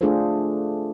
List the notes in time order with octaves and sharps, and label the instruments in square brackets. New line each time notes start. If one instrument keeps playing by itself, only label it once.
[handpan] A3 D4 F4 G#4 A4 C5